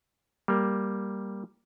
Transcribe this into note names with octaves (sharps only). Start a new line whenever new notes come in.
G3 A#3